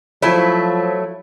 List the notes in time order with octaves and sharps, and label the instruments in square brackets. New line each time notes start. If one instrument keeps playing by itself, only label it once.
[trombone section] F3 [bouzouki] F#3 A3 E4